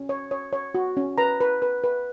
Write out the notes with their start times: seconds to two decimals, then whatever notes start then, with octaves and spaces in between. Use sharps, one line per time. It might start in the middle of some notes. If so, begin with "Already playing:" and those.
Already playing: C#4
0.09 C#5
0.31 C#5
0.53 C#5
0.75 F#4
0.97 C#4
1.18 B4 A#5
1.41 B4
1.62 B4
1.84 B4